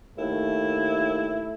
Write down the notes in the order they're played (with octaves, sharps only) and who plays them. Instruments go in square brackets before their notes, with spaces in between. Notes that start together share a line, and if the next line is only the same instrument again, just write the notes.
[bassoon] D#2 [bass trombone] A3 [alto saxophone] E4